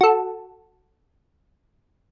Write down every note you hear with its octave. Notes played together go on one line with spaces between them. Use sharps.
F#4 A4